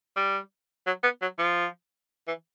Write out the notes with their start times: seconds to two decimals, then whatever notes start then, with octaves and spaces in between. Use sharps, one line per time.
0.16 G3
0.87 F#3
1.03 B3
1.22 F#3
1.39 F3
2.28 E3